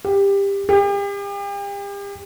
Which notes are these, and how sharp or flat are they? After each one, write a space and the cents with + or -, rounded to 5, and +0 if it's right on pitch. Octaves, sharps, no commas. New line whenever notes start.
G4 +20
G4 +40